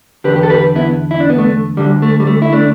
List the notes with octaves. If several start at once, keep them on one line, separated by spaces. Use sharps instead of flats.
E2 D3 G4 B4
G4
A4
G4 B4
B3 E4
E4
D4
B3
A3
D2 D3 G3
A3
G3
A3
E4
A3 D4